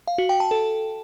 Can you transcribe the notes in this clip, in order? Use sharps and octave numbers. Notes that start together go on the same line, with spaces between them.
F5
F#4
G5
A5
A4